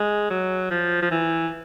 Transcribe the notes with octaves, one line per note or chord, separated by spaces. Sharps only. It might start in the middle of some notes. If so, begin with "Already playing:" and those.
Already playing: G#3
F#3
F3
F3
E3